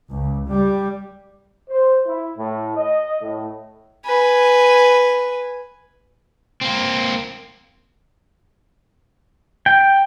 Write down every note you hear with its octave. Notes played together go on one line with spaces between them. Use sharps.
C#2
G3
C5
E4
A2
D#5
A2
B4 G#5
A#3 C4
G5